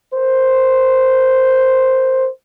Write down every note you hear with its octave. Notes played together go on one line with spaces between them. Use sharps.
A#4 C5